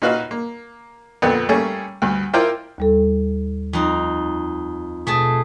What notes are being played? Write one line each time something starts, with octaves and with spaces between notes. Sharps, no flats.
A#2 D#4 F#4 B4 F5 F6
A#3
F2 A#2 D3 B3
G3 A3 A#3 C#4 G#4
D2 G2
E4 F4 A#4 C5 G5 D6
D#2 G3 A4
F2 D#4
B2 A3 G#4 A5